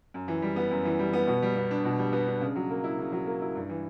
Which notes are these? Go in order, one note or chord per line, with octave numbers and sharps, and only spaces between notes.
F#2
E3
G3
B3
F#2
E3
G3
B3
B2
G3
B3
D4
B2
G3
B3
D4
C#3
F#3
A#3
E4
C#3
F#3
A#3
E4
G2
E3